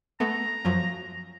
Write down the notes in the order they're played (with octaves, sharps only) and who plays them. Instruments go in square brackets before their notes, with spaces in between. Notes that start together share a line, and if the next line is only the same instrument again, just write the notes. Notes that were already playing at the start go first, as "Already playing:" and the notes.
[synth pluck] A3 B3 [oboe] A#5
[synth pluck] F#2 F3 F#3